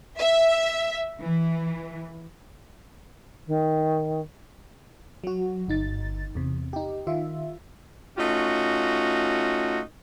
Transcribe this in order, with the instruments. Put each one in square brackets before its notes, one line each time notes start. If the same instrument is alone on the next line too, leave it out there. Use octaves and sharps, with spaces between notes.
[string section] E5
E3
[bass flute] D#3
[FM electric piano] F#3 F#4
G1 D#4 A6
E2 C3
D#4 G4
D#3 F4 E5
[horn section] A3 C#4 D#4 F4 F#4